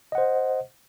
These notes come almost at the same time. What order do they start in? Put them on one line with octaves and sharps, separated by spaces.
D#5 F#5 C5